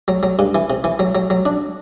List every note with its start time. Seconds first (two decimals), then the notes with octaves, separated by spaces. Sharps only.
0.08 F#3
0.23 F#3
0.39 G2
0.55 E3
0.70 C3
0.84 E3
0.99 F#3
1.15 F#3
1.30 F#3
1.45 D4